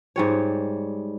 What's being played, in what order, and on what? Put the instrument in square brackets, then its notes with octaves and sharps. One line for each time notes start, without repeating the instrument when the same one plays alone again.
[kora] G#2 G3 C#5